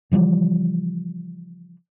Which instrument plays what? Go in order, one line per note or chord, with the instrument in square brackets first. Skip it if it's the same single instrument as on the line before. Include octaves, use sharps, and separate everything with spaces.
[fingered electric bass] C#3 E3 F3 G3